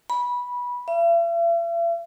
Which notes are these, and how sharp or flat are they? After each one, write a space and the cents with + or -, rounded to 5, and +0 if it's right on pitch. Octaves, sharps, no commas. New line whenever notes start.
B5 -15
E5 +45